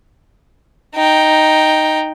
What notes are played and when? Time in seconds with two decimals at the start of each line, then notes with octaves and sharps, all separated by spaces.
0.95 D#4 G5